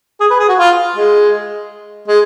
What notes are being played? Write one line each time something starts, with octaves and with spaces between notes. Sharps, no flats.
G#4
B4
G#4
F#4
F4
G#3
G#3